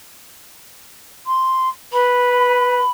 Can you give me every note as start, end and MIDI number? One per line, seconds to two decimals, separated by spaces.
1.27 1.69 84
1.93 2.80 71
1.93 2.91 83